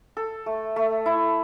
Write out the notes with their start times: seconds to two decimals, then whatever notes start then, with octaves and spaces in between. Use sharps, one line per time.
0.17 A4
0.46 A3
0.76 A3
1.06 E4